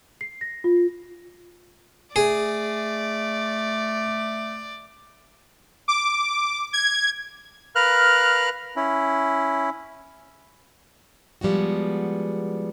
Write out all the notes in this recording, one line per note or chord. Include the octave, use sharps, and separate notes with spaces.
C7
A#6
F4
A3 G#4 D5
D6
G#6
A#4 B4 F5 F6 F#6
C#4 E4
F3 G3 G#3 B3 F#4